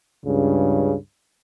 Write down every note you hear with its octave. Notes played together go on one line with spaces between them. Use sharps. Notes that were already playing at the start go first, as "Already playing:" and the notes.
C#2 G2 C#3